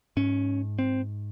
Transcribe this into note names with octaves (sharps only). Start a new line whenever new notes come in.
G#2 C#4
C4